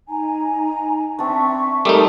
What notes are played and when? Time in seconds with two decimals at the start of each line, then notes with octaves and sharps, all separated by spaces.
0.08 D#4 G#5 A#5
1.19 C4 D4 E5 C#6
1.85 G3 A3 D#4 A4 A#4 C6 D6 D#6